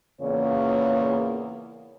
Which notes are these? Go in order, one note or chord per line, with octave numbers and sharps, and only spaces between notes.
E2 A#2 C#3 A#3 C#5